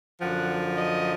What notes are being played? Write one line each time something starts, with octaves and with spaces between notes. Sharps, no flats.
F#2 D3 F3 F#5
D#5